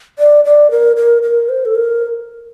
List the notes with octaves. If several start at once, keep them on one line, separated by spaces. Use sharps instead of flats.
D5
D5
A#4
A#4
A#4
C5
A4
A#4